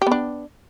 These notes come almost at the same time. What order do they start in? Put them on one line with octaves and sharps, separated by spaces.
G4 B3 D4